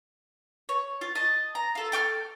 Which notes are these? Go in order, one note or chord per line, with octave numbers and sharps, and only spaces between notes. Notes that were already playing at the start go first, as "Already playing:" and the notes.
C#5
F4
D#5 A5
A#5
F4 A4
A4 G5 D6 F6